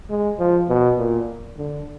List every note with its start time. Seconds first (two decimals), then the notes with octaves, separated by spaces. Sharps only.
0.10 G#3
0.39 F3
0.68 B2
0.98 A#2
1.58 D3